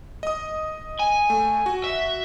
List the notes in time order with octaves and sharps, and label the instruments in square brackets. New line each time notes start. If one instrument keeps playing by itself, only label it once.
[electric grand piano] D#5 D#6
[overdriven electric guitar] G#5
[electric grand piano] A3
F#4
[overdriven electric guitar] E5